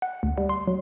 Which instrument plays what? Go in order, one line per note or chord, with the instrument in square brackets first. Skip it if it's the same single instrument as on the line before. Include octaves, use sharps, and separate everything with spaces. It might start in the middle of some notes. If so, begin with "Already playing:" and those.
[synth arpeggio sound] F#5
D2
G3
C6
F#3